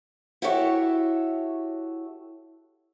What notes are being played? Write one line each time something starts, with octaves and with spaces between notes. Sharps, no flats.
E4 F#4 G4 A4 C#5 E5